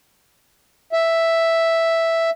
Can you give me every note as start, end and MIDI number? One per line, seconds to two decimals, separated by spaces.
0.93 2.30 76